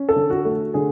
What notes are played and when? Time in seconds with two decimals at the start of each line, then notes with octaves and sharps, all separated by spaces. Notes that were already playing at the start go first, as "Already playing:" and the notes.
Already playing: C#4
0.09 A4
0.16 D3
0.30 F#4
0.45 A3
0.74 D3 G#4